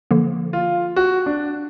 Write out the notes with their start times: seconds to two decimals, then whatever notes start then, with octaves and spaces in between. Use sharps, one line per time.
0.11 D3 F3 A#3
0.53 F4
0.96 F#4
1.26 D4